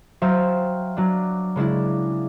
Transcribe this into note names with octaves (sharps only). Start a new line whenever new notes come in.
F#3 C5 E5 F5 G5
F#3 D4
C#3 G#3 D4 E4